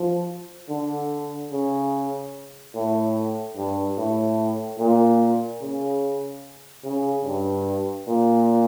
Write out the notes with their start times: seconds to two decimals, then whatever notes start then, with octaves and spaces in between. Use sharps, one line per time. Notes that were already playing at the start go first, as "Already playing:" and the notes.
Already playing: F3
0.69 D3
1.51 C#3
2.74 A2
3.57 G2
3.98 A2
4.79 A#2
5.62 C#3
6.85 C#3
7.25 G2
8.08 A#2